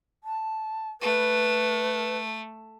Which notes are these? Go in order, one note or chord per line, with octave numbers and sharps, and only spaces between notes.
A5
A3 B4